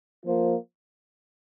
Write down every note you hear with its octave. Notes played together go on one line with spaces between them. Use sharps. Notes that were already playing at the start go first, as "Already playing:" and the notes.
F3 A#3 F4 C5